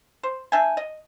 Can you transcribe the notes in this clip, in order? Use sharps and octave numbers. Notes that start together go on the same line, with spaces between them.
C5
D4 E5 G5 G#5
D#5